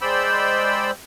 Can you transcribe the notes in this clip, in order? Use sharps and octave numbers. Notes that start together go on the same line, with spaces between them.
G#3 C5 D5 G5 B5 E6